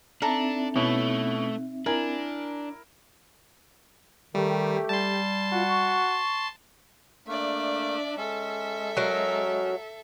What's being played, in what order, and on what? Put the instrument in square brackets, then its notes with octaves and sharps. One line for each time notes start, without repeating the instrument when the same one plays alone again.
[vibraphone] C4 D#4 E5 [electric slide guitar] D4 [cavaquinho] A4 A#5
[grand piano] B2 C#4 E4 [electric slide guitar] A3
[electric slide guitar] D4 [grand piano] E4 A#4 [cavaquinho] G#5
[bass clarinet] D#3 [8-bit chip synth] G3 [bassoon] A3 [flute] G4
[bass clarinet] G3 [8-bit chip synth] A5 C6
[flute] F4 [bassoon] F#4
[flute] C#6
[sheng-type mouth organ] A3 A#3 [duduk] D4 [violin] D5 E5
[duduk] G#3 [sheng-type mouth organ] C#4 [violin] A4 E5
[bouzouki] F#3 A#4 [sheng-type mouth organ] C#4